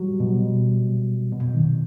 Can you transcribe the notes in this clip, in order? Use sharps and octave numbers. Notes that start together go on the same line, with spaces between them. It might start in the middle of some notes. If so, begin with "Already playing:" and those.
Already playing: F#3 G3
B2
B2
D#3